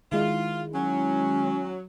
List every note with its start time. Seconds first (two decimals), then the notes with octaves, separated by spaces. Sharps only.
0.12 D#3 G#3 E4 F4
0.74 F#3 C#4